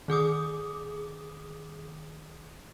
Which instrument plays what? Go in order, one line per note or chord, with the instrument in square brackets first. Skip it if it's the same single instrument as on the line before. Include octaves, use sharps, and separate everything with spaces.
[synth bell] D#3 G#4 D6 D#6